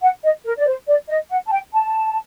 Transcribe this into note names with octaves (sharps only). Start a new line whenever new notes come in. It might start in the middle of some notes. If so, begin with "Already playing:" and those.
F#5
D#5
A#4
D5
C5
D5
D#5
F#5
A5
G5
A5